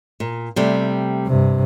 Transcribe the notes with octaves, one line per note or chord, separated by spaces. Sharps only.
A#2
C3 G3 A3
G2 C3